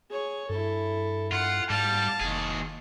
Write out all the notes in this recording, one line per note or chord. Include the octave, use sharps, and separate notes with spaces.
G#4 C#5
G2 E4 A4
G2 F4 F#5
G#2 G3 F5 A5
F1 D#2 G#4